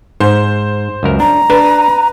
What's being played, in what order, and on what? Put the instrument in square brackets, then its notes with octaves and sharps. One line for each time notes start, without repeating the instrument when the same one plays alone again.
[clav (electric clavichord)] G#2 [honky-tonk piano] C5
[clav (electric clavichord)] C#2 F#2 A#4
[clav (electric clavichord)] D4 [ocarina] A#5
[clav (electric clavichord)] D4 A5 [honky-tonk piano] B4